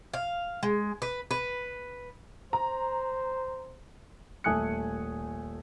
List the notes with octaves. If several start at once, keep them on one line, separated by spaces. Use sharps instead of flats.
F5
G#3
B4
B4
C5 A#5
D#1 A3 G#5 D#6 F#6 C#7